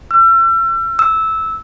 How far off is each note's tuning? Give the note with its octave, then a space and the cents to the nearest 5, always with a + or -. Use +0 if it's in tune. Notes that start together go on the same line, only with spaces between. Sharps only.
E6 +40
E6 -15